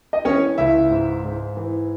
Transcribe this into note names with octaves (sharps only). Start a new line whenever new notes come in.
D#5
E3 C#4 C#5
C#2 E4 E5
G#2
G#2
E3